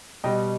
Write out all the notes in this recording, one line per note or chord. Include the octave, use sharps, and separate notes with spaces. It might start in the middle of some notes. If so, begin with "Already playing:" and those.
B2 G3 D#5 G5